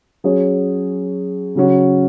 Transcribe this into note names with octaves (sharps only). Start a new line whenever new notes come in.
F#3 C#4 G#4 C#5
C#3 F#3 C#4 F#4